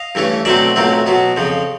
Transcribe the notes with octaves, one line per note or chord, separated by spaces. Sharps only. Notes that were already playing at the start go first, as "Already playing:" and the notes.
Already playing: D#5 F5
G2 E3 A3 C#4
B2 F#3 A3 C4 D5 E5
B1 A#2 F#3 A3 C4
B2 F#3 B3
F2 C#3 F3